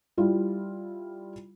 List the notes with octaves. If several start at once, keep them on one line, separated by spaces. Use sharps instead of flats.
G3 E4 F4